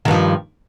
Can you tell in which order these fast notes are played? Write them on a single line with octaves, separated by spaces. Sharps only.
D#3 G2 F3